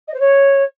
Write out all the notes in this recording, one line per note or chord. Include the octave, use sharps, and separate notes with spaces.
D#5
C5
C#5